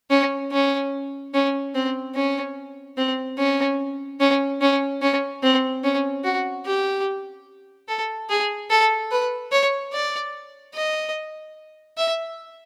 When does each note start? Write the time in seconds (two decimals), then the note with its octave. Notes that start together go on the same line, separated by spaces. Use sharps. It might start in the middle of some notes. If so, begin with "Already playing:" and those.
0.10 C#4
0.52 C#4
1.34 C#4
1.75 C4
2.15 C#4
2.97 C4
3.38 C#4
4.20 C#4
4.61 C#4
5.02 C#4
5.43 C4
5.84 C#4
6.24 F#4
6.65 G4
7.88 A4
8.29 G#4
8.70 A4
9.11 B4
9.52 C#5
9.93 D5
10.74 D#5
11.97 E5